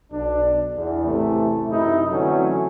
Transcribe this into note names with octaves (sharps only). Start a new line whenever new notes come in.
B1 D4
E2
A1 C3 E3 A3
F#2 C3 D#4 E4
D3 E3 F#3 A3 C4 C#4